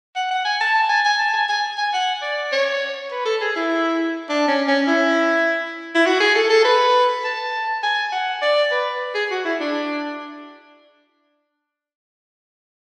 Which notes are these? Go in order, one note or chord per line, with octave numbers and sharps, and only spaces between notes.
F#5
F#5
G#5
A5
A5
G#5
G#5
A5
G#5
G#5
G#5
F#5
D5
C#5
B4
A4
G#4
E4
D4
C#4
C#4
E4
E4
F#4
G#4
A4
A4
B4
A5
G#5
F#5
D5
B4
G#4
F#4
E4
D4